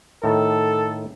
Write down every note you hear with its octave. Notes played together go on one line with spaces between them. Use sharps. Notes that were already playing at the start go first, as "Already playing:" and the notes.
A2 D#3 A4